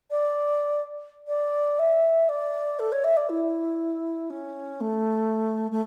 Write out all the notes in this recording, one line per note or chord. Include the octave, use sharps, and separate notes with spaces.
D5
D5
E5
D5
A4
C#5
E5
D5
E4
C#4
A3
A3